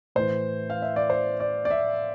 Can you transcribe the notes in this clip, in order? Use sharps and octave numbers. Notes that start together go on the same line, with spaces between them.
A2 E3 C5
F5
E5
D5
C5
D5
D5
E5